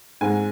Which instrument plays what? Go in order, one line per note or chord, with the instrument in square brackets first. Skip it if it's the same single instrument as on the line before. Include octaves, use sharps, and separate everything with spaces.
[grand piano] G#2 G#3 C4 G#5